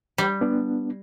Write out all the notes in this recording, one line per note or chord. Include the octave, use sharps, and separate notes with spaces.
G3
B3 D4